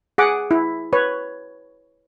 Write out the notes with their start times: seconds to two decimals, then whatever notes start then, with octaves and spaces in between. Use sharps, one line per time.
0.18 G#4 F#5 D6
0.51 E4
0.93 B4 C#5